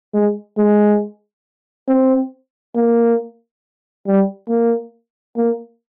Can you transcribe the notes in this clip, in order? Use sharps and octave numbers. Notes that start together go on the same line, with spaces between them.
G#3
G#3
C4
A#3
G3
A#3
A#3